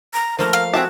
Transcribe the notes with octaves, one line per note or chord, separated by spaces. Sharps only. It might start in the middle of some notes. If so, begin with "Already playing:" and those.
A#5
F3 A3 A#3 A#4
F5
C4 F#4 G#4 E5 A5